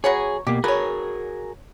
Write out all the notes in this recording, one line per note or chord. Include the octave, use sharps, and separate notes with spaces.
F#3 B3 G#4 C#5
B2 A#3 G4
F#4 G#4 A#4 B4 C#5